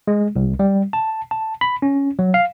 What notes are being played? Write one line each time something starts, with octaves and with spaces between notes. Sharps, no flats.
G#3
C2
G3
A5
A5
B5
C#4
F#3
F5